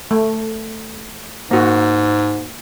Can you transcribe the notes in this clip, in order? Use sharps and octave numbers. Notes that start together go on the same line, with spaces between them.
A3
G#2 A#3 F#4